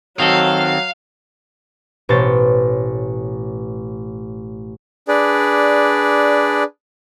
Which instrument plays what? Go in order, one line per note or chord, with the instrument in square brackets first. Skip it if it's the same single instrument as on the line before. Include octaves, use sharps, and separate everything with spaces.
[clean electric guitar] D#3 C4 A4 [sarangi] F#3 [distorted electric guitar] F5
[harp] A1 B2 C5 C#5 A6
[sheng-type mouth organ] D4 G#4 B4 D5